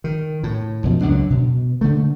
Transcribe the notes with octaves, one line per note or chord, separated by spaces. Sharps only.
D#3
A2
F#2 B2 F3
C#2 F#2 F#3 D4
B2
D3 A3